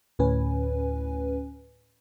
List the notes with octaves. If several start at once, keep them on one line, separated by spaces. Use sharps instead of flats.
D2 A2 C#4 B4 G#5